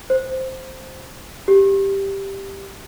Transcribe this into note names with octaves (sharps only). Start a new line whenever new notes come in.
C5
G4